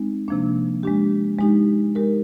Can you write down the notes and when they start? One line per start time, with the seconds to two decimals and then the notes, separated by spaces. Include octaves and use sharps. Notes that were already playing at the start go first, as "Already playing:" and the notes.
Already playing: G#3 C4 D#4
0.28 C3 F3 A#3 D4
0.83 G#3 D4 G4
1.39 G#3 D#4 G4
1.95 G#3 D#4 G4 A#4